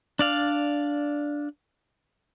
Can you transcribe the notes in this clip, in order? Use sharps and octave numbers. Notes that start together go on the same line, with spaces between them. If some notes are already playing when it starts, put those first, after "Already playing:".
D4 D5 F5